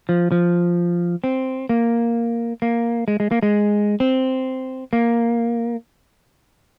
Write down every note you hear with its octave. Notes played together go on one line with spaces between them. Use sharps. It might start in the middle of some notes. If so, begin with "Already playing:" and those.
F3
F3
C4
A#3
A#3
G#3
G#3
A#3
G#3
C4
A#3